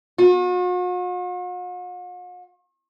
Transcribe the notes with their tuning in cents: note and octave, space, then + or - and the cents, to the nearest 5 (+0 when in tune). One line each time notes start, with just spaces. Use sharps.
F#4 -45